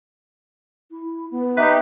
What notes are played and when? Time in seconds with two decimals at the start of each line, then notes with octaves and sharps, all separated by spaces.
0.91 E4
1.31 B3
1.57 D#4 G4 B4 E5